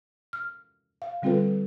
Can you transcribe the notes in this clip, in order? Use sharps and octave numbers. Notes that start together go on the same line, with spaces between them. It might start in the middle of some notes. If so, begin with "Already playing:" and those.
F6
F5
D3 G3 C4 F4 A4 B4